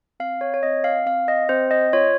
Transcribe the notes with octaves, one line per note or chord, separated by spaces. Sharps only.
C4 F5
C#5
C#5
C4 D#5
F5
C4 F5
D#5
C4 C5
D#5
F4 C#5